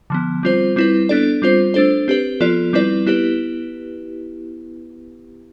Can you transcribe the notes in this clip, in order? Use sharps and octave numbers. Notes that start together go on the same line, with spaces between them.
D3 F3 B3
G3 C4 F4 C5
G3 C4 E4 B4
B3 D4 A4 D5
G3 C4 F4 C5
A3 D4 A4 C5
C4 G4 B4
F3 B3 F4 A4 D5
G3 C4 E4 B4 D5
B3 E4 G4 B4